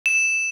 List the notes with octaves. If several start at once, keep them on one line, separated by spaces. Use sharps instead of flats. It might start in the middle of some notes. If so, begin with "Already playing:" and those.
E7